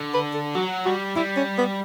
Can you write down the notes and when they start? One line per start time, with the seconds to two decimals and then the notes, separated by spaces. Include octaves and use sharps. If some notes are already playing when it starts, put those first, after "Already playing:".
Already playing: D3
0.14 B4
0.34 A4
0.55 F#3 F#4
0.85 G3 F#4
1.16 G3 E4
1.37 C#4
1.58 B3